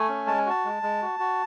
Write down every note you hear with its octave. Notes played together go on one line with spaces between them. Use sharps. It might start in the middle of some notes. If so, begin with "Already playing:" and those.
Already playing: A3 G#5
C#4
G#3 A5
G#5
F#4 A5
G#3
G#3
F#4
F#4